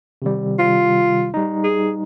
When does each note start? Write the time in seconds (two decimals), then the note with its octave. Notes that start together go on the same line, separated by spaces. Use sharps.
0.22 C3 D#3 G3
0.59 F4
1.34 G3 D#4
1.64 G#4